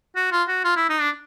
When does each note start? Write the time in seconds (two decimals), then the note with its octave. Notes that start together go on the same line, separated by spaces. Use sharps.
0.16 F#4
0.32 F4
0.48 F#4
0.64 F4
0.76 E4
0.90 D#4
1.01 D4